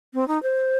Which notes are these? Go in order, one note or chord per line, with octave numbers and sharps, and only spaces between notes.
C4
D#4
C5